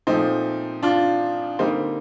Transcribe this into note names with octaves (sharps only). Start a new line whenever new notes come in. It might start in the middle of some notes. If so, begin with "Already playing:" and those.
A#2 F3 A3 C4 D#4
D4 F4
D3 G3 A#3 C4 D#4